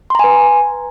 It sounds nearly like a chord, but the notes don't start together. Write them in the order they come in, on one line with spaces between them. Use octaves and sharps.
C6 A#5 G#5 B4